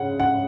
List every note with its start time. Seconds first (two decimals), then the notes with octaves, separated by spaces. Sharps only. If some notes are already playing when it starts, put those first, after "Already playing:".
Already playing: C#3 F#5
0.20 F#5